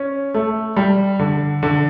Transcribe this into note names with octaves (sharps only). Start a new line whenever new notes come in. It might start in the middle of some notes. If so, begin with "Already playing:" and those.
Already playing: C#4
A3
G3
D3
D3